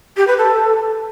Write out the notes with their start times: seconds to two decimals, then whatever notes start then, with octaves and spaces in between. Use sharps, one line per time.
0.17 G4
0.27 B4
0.38 A4